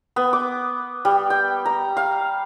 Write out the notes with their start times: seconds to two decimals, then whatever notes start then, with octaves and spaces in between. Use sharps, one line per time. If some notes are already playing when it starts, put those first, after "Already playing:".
0.16 B3
0.33 D6
1.05 G3
1.30 G5
1.65 A#5
1.97 F5